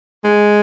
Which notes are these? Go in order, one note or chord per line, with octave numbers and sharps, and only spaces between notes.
G#3